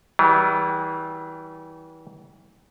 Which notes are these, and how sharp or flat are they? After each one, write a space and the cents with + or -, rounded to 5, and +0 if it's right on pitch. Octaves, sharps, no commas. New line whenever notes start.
E3 -30 G3 -35 G4 +35